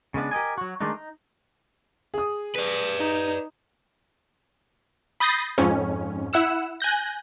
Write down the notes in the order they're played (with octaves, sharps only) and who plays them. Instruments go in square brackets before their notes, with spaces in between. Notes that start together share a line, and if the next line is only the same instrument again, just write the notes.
[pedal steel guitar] C#3 G#3 B3 D4
G4 A#4 D#5 G#5
F#3 F#4
D#3 G#3 A3 D4 D#4
D#4
[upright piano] G#4 D#6
[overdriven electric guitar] B4 D5
[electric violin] D#4
[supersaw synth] B5 D#6 G6 A6 A#6 C7
F2 G#2 C#4
E4 F#5 E6 E7
G#5 F#6 G6 A#6